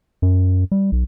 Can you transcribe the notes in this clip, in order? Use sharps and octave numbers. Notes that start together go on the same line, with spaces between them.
F#2
G3
B1